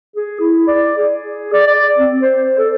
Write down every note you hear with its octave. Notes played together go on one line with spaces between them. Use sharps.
G#4
E4
D5
G#4
D5
D5
C4
C5
A4